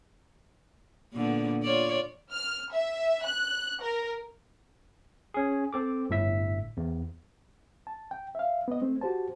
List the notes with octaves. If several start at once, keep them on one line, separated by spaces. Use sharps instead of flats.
A#2 D3 B3
F4 C#5 D5
F6
E5
F#6
A#4
C#4 G#4
C4 A4 D6
G1 A2 E5 B6
E2
A5
G5
E5 F5
B3 D#5
A3 C4
F#4 G4 C5 A5